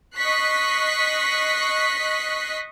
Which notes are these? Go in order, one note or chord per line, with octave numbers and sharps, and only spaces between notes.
D#5 C#6 F#6 B6 C7